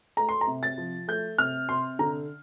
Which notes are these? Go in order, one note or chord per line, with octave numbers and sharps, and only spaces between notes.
A3 A#5
C6
A#5
C3
A6
F3
A3 G6
C3 F6
C3 C6
D3 A#5